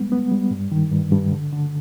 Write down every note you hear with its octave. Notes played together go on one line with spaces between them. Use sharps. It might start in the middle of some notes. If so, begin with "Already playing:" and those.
Already playing: G3 G#3 B3
B3
G3
G2
D#3
G2
G2
D3
D3